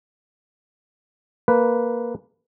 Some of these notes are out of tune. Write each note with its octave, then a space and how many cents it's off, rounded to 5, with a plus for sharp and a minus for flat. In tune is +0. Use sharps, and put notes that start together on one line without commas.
A#3 +0 B4 +0